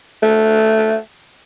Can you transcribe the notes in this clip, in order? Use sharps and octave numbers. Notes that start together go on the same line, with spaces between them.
A3